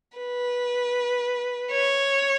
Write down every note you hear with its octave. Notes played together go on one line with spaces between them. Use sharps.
B4
C#5